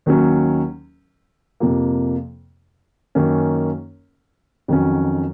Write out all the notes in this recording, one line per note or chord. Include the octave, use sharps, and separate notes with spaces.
D#2 D#3 F#3 C#4
F2 C3 F3 A#3
F#2 D#3 A#3 C#4
F2 D#3 F#3 C#4